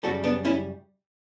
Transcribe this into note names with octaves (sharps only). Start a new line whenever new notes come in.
F#2 C#3 G3 F#4 A4
B3 D4
C#4 E4